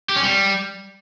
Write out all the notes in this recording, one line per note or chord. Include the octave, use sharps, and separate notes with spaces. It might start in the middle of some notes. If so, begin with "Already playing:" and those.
G4
C#4
G3